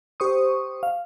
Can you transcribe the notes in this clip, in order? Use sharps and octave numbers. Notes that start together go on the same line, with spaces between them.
G4 C5 C#6 D#6
F5